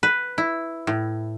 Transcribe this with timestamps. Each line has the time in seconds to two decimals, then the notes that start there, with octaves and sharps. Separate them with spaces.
0.03 B4
0.38 E4
0.87 A2